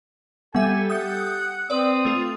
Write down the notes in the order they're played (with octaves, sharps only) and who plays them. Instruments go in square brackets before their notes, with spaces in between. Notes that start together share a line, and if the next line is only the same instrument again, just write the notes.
[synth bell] G3 E5 [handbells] B3 [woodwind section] G4 A4 [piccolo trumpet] G#5
[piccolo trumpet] F#5 [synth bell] D#6 G6 C#7
[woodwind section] C4 [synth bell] B4 D5 [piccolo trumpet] D#6
[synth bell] A3 F4